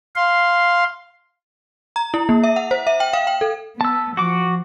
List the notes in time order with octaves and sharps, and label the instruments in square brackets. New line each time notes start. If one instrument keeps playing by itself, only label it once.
[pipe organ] F5 C6
[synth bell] A#5
E4
A#3
E5
F#5
C5
E5
G5
F5
G5
A4
[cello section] B3 [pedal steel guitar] A5 E6
[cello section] F3 [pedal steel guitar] F#4 D6